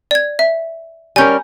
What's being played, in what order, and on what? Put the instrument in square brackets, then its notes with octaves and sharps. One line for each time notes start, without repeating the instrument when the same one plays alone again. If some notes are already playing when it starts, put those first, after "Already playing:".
[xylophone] D5 G#6
E5
[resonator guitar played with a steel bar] G3 C#4 A#4 [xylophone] G#5 G6